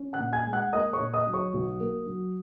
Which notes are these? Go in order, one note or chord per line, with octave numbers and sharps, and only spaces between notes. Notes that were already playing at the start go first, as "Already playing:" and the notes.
Already playing: C#4
F#5 F#6
A#2
G#5 G#6
G#3
F#5 F#6
A#3 D#5 D#6
C#5 C#6
A#2
D#5 D#6
F#3
C#5 C#6
B1
A#3
F#3